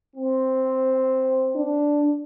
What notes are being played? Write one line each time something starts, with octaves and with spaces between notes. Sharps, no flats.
C4
D4